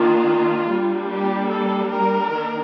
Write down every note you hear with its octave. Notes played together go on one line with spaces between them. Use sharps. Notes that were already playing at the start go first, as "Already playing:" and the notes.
Already playing: D#3 A#3 D4 F4
G3 A#3 D4
G4
A4
A#4
D#3 A#3 D4